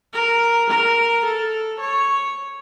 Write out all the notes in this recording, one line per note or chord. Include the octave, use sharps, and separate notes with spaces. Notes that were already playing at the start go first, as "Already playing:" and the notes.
A#4
A#4
A4
C#5